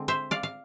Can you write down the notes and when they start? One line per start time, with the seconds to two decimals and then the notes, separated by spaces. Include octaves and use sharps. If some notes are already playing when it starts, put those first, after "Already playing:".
Already playing: D3 G#3 C4
0.08 C5 E5
0.31 D5 F5
0.43 F5